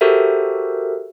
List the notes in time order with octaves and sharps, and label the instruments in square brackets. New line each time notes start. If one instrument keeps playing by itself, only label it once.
[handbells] F#4 G4 A4 A#4 C5 E5